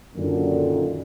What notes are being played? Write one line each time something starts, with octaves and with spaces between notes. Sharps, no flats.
F#2 A#2 D3 D#3